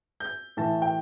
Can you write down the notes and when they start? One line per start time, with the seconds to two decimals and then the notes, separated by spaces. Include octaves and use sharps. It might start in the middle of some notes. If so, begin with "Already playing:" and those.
0.20 G6
0.57 A2 E3 A5
0.82 G5